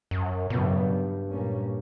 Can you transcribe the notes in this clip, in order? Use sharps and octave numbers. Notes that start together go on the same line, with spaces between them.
F#2
A#2 C#3 F#3 B3
G2
F#2
G2
A#2 G3 A#3 C#4